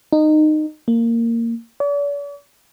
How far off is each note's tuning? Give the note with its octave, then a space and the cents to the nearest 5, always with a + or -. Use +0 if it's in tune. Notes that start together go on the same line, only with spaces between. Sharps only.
D#4 -20
A#3 -15
D5 -45